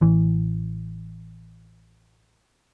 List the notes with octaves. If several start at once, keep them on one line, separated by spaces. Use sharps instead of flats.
A1 E3